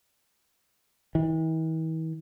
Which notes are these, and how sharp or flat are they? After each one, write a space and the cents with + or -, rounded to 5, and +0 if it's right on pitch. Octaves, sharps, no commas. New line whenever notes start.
E3 -45